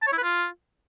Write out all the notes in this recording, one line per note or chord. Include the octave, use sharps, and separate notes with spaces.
A5
C#5
E4
B4
F4